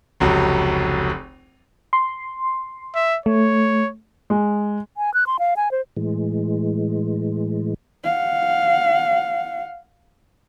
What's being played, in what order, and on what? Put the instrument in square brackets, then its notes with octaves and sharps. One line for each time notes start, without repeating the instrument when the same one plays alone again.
[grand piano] F1 C#2 F#3
[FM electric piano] C6
[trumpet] E5
[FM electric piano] A3 [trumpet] C#5
[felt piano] G#3
[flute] G#5
F#6
C6
F5
G#5
C5
[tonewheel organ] A2 E3 G#3
[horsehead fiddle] F5 F#5